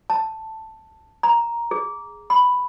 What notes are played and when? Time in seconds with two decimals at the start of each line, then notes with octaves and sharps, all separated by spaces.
0.10 A5
1.23 A#5
1.71 G#4
2.30 B5